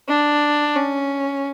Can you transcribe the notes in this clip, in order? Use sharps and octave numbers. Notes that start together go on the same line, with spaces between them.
D4
C#4